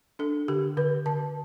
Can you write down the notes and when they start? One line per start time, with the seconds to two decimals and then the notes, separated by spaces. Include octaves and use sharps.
0.19 D4 A4
0.48 D3 G4
0.77 D3 B4
1.05 D3 A5